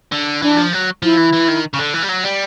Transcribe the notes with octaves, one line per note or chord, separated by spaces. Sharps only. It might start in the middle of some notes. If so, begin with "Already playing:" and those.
D3
E3 D4
F3
F#3
F3 E4
E3
E3
D#3
C#3
D3
E3
G3
F#3
G3